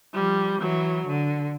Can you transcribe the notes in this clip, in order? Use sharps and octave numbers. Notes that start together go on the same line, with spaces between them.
F3 G3
E3 F#3
D3